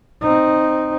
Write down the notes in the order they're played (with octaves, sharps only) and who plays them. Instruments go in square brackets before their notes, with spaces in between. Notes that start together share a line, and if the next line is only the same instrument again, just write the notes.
[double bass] C4 D#4